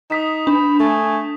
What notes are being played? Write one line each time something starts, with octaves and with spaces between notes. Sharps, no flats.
D#4 D#6 B6 E7
D4 B5
A3 G#5